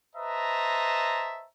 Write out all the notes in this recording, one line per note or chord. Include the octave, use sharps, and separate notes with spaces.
B4 C5 D#5 E5 A5 A#5